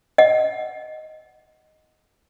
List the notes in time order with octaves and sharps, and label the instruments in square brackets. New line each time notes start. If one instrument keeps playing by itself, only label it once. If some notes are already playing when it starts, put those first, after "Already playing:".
[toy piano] D#5 F#5